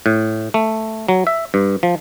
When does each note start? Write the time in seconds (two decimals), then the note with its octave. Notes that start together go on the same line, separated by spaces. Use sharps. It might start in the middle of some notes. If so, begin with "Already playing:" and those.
0.06 A2
0.54 A3
1.09 F#3
1.27 E5
1.54 G2
1.83 F3